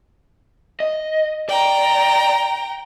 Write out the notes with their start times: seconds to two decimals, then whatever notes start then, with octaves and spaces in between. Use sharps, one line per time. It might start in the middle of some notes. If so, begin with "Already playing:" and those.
0.80 D#5
1.49 D5 G5 A#5